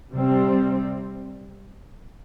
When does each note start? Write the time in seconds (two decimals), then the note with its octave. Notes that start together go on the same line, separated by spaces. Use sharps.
0.12 C3 G3 C4